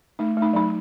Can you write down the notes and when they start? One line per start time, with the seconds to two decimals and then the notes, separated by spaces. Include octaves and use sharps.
0.19 A3 D#4
0.37 A3
0.42 D#4
0.53 F#3 D#4